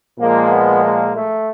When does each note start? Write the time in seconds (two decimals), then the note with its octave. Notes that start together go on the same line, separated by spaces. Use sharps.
0.18 A#2 F3 G#3 A#3
0.50 B3
0.83 A#3
1.15 A3